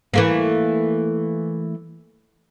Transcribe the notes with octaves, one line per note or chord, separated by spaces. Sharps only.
E3 A3 A#3